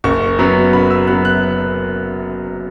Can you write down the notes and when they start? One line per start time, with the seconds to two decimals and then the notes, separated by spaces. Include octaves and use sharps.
0.04 F#1 C#6
0.38 F#2 F#3 B3
0.73 F#1 B5
0.90 E6
1.07 F#2 F#3 B3 F#6
1.25 F#6